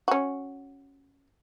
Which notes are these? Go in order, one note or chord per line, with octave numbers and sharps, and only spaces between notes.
C#4 F#4